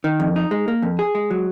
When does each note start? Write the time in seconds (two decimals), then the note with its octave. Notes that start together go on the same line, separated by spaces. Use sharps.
0.04 D#3
0.20 F2
0.36 D#4
0.51 G#3
0.68 A#3
0.82 F2
0.99 G#4
1.15 G#3
1.30 F#3